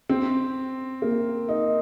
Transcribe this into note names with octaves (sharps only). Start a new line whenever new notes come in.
C4
A#3
D#4